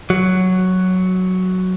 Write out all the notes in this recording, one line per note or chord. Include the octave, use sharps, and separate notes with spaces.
F#3